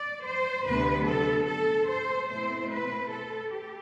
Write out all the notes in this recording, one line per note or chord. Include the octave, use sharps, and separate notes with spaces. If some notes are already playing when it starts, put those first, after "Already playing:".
Already playing: D5
C5
D2 C3 F#3 B3 D4 B4
A4
A4
C5
B2 A3 C4 E4 C5
B4
A4
G4